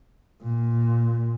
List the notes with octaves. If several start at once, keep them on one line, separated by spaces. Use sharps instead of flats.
A#2